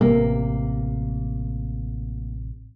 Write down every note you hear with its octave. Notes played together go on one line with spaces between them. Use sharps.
A1 C3 A#3